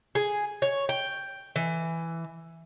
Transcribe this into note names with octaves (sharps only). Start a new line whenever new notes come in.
G#4
C#5
G5
E3